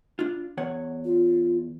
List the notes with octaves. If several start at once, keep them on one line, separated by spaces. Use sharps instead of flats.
D4 F4
E2 C#5 F#5
F4